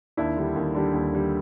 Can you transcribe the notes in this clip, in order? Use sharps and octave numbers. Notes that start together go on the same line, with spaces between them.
D#2 D4 E4
D3 G3
D#2
D3 G3
D#2
D3 G3